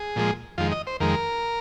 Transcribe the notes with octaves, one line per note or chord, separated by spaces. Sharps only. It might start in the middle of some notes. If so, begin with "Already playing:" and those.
Already playing: G#4
A#2 F3 G#3
F2 D#3 G#3 F4
D#5
C5
F2 D#3 G#3 A#4